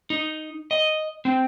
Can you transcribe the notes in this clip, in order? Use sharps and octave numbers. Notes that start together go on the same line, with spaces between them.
D#4
D#5
C4